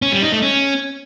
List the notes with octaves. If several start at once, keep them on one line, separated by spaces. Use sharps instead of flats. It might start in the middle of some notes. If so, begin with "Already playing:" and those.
C#4
G3
D#4
A3
C#4